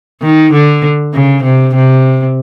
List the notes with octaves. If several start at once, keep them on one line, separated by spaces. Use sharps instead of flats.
D#3
D3
C#3
C3
C3